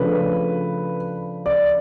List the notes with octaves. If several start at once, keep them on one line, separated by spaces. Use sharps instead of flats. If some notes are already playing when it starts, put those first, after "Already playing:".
Already playing: C#3 F3 A3 D4 B4
D5